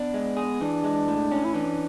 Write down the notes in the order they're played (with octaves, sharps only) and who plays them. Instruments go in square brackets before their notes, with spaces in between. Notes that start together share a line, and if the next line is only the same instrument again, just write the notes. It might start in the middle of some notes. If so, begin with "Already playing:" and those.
Already playing: [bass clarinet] B3 [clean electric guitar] D4
[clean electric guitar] G#3
G#4
[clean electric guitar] E3 [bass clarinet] D4
[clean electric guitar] G#3
A2
C#4
[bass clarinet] E4
[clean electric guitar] E3 [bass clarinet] D4